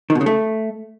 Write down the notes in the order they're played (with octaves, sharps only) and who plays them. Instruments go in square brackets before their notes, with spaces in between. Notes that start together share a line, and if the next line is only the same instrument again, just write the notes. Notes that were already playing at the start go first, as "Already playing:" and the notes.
[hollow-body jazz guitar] D#3
B2
C#3
A3